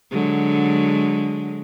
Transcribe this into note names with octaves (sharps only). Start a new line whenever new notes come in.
D3 F#3 G#3